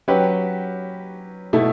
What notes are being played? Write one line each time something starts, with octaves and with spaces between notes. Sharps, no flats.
F#3 C#4 G4 B4
B2 A3 E4